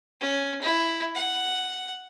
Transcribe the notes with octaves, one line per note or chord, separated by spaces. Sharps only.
C#4
E4
F#5